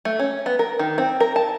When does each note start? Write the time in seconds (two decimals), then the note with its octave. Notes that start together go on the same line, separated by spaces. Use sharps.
0.05 A3
0.19 C#4
0.46 B3
0.59 A#4
0.79 D#3
0.98 C4
1.20 A#4
1.36 A5